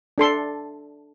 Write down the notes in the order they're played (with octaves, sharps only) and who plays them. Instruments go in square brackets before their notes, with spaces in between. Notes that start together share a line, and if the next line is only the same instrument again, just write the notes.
[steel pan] D4 A4 C6